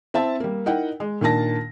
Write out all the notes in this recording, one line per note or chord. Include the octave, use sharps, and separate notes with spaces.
C4 E4 E5 A5
G3 A#3
D#4 E4 A#4 F#5 G5
G#3
A#2 D#3 A#3 D4 A5 A#6